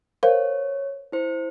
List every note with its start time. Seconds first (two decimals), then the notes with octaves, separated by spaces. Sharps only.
0.23 A#4 C5 C#5 F5
1.12 E4 C5